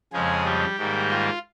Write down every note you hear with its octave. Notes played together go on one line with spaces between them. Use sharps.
F2 C#3 F3 G#3 G#4
G3 G4
G#2 D#3 G3 A#3
F4